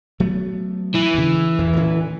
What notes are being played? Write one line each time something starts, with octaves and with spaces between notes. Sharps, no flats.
F#3 A3 B3
E3
D2 C#3
E2
A2 D3 C#4